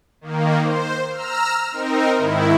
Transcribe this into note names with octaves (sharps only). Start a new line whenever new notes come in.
D#3 A#3
C5
A#5 E6 F6
C4 D#4 A#4
G#2 D#3 E4